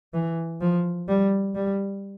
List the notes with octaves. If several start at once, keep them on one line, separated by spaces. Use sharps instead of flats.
E3
F3
G3
G3